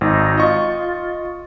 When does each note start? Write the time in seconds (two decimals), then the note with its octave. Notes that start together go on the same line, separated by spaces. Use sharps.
0.01 G#1 D#4
0.38 F4 D#5 C#6